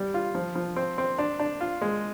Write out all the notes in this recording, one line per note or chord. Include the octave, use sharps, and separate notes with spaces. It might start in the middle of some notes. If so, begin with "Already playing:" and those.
Already playing: G3
F4
F3
F3
C4
C4
D4
D4
F4
G#3